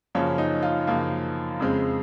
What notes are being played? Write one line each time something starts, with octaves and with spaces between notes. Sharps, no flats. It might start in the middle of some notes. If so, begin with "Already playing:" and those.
F#2 C#3 F3 A#3 C#4
D#4
F4
F#2 C#3 F3 A#3
F2 C#3 G#3 C4